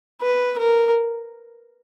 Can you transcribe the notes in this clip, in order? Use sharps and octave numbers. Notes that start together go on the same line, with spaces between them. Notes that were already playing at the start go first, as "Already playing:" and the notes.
B4
A#4